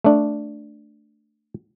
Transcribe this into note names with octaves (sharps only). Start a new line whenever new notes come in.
A3 D4